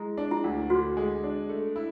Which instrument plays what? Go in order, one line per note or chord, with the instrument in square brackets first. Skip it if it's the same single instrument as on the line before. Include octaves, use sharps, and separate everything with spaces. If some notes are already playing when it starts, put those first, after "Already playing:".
Already playing: [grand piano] G#3 [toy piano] E4
[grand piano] D4
[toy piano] E4
[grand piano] D2
[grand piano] D3 [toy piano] F#4
[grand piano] G#3
D4
A3
E4